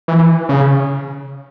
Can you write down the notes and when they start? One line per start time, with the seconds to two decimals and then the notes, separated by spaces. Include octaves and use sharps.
0.08 E3
0.49 C#3